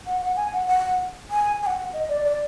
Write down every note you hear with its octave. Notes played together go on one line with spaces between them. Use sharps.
F#5
F#5
G#5
F#5
F#5
G#5
G#5
F#5
D#5
D5
D5